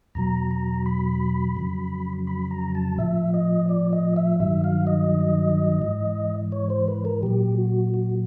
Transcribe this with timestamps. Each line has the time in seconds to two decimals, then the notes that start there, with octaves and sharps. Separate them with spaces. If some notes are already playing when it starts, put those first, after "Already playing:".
0.15 E2 B2 F#3 A#5
0.51 A#5
0.86 B5
1.57 F2 C#3 F#3
2.27 B5
2.51 A#5
2.75 A5
2.98 A2 F3 E5
3.34 D#5
3.69 D5
3.93 D#5
4.16 E5
4.40 G2 D#3 F#3 E5
4.64 F5
4.87 D#5
5.82 G#2 E3
6.52 C#5
6.70 C5
6.88 B4
7.05 A#4
7.23 A#2 F#3 G4
7.58 F#4
7.94 F#4